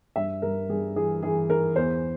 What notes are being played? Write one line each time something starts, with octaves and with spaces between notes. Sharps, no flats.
G2 E5
G2 A#4
G2 G#4
E3 G#4
E3 G#4
E3 A#4
E2 C5